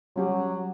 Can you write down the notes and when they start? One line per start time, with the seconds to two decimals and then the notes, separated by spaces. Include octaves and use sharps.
0.16 F#3 G3 C#4 G4